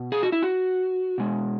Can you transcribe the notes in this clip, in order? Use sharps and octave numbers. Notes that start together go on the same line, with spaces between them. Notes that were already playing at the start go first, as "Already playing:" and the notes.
Already playing: B2
G#4
F#4
E4
F#4
B2 G#3